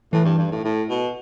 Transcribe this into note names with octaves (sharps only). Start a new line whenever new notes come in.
A2 E3
G2
G2
A2
A2
B2